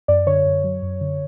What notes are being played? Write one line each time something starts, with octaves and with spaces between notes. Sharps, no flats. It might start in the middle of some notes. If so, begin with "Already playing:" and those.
F#2 D5
D3 C#5
F#2
F#3
F#2
D3